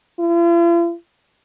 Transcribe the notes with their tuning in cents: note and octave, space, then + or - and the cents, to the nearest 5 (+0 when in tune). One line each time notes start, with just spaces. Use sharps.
F4 -45